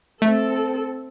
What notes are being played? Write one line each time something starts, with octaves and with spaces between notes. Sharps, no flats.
A3 C4 A4